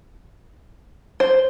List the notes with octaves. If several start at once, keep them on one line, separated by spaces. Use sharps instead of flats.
C5